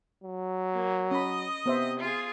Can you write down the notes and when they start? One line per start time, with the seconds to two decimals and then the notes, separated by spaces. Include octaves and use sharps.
0.24 F#3
0.74 A#3
1.11 C#4 D#5 B5
1.66 C3 B3 C5 E5
2.00 F4 G#4